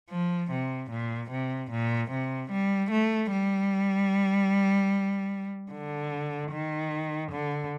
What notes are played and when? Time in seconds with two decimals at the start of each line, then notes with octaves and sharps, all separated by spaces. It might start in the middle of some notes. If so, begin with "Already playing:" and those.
0.11 F3
0.51 C3
0.91 A#2
1.31 C3
1.71 A#2
2.11 C3
2.51 G3
2.91 A3
3.31 G3
5.72 D3
6.51 D#3
7.32 D3